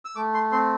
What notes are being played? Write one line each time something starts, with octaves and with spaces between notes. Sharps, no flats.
E6
A3 D6
C6
C4 C6